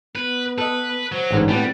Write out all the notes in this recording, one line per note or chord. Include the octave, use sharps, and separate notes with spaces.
B3 B4
A4 B4 D#5
F#3 C5
A1 G#2 D3
A2 G3 B3 C4 G4